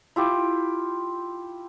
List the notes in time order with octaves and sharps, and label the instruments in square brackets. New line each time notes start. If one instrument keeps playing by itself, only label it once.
[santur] E4 F4 G4